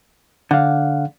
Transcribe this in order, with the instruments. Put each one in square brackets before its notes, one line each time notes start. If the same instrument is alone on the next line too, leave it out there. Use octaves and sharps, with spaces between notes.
[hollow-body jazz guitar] D3 [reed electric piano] F5 F#5